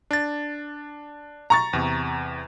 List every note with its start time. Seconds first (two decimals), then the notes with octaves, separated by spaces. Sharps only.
0.11 D4 A6
1.50 A#5 C#6 A6
1.73 E2 C3